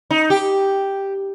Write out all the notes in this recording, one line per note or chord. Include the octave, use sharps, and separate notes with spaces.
D#4
G4